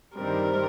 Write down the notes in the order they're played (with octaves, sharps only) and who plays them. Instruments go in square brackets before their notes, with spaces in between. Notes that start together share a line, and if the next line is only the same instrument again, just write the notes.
[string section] G2 D#3 G3 C4 [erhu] A#4